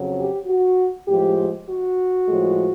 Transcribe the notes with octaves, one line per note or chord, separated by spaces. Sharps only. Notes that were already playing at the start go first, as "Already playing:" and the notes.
Already playing: F2 C#3 F#3
G4
F#4
A2 F3 G#3 G4
F#4
A2 F3 G#3